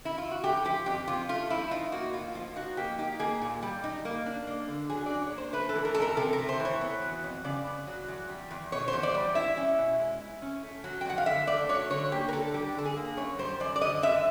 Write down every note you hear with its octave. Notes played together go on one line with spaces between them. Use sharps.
E4
F4
F#4
A3 G4
F3 G4
F2 G4
C3 F4
A3 F4
F3 E4
D#4 F4
A#3 F#4
A2 F4
F3 F4
D#4 F#4
A#3 G4
D#4 G4
A#3 G#4
A#2
G3
D#4
A#3
D4
A#3
D3
F#3 G#4
D4 D5
C#5
A#3
C5
A3 B4
A4
E3
A#4
F2 A4
A#4
C3 A4
A#4
A3
C5
E3
C#5
B3
F#3
F2
C#3 D5
B3
F#3
E2
G3
E2
B2 C#5
C5
E2
D5
G3
E4 E5
C#4
B2
G#3
E4
C#4
A3
F#3
G5
F2 F#5
F5
D3 E5
A3 D5
F#3 C#5
D3 C#5
A#3 G4
A#4
D3 A4
G3 G4
D3 A4
G#4
A#3
F#2 C#5
G3 C5
F#2 D5
D5
D3 D#5
F#2 E5